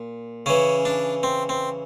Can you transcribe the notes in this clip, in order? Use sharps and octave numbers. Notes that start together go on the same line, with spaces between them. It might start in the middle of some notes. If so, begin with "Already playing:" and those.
Already playing: A#2
C#3 E3 C#4
D4
C4
C4